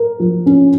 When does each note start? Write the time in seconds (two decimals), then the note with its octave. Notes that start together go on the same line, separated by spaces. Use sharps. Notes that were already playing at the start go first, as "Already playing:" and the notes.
Already playing: A#4
0.20 F3
0.46 C#4